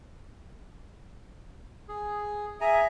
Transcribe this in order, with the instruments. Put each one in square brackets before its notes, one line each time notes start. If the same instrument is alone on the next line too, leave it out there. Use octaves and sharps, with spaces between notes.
[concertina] G#4
[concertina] G#4 G#5 A#5 [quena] E5